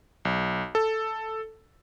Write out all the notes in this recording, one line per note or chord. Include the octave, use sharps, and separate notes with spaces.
B1
A4